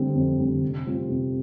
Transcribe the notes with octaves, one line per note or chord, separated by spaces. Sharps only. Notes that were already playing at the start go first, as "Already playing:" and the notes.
Already playing: D3 G3 C4
F2
D3 G3 C4
C3
G3 C4 F4
C3